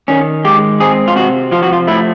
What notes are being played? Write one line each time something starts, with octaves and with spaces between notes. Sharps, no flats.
D#3 C#4
G#3 G4
C4 G#4
F4
C3 F#4
F3 F4
F#4
F4
A3 E4